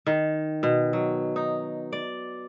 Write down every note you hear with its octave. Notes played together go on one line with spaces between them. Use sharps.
D#3
B2
F#3
D#4
D5